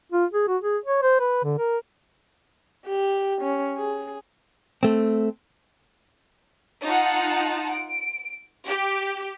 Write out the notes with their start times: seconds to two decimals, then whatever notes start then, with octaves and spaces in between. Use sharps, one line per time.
0.12 F4
0.33 G#4
0.48 F#4
0.63 G#4
0.86 C#5
1.03 C5
1.20 B4
1.44 D3
1.58 A#4
2.86 G4
3.42 C#4
3.78 G#4
4.83 A3 C4
6.83 D#4 F4 F#5 A5
7.72 D7
8.67 G4